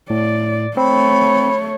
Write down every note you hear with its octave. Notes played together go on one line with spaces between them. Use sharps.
A2 D5
A3 C4 C#5 B5